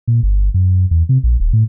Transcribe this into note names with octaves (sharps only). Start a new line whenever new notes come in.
A#2
G1
F#2
E2
C3
A#1
D#1
A2